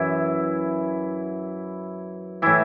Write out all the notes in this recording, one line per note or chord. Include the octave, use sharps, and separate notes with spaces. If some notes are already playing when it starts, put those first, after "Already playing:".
Already playing: F#2 E3 E4
A2 E3 E4